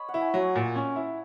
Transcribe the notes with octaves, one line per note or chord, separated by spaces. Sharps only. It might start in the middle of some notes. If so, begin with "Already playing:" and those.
Already playing: C#5 D#5 B5
F#5
E4
G#5
F#3 F#5 A#5
A#2
C#4
E4